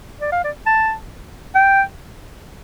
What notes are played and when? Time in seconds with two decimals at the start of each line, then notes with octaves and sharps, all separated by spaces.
0.21 D5
0.32 F5
0.44 D5
0.66 A5
1.55 G5